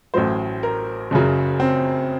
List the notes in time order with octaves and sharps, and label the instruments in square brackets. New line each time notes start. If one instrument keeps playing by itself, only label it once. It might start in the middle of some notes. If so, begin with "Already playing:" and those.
[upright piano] A1 A2 F#3 C5
A#4
F#1 F#2 C#3 F#3
C4